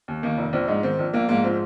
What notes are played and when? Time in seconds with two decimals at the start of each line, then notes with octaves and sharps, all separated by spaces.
0.08 D#2
0.23 D#3 A#3
0.37 F1
0.53 A#1 C4
0.68 G#2 D#4
0.83 D#3 C4
0.99 A#1
1.13 A#1 A#3
1.29 G#2 A#3
1.44 F3 C4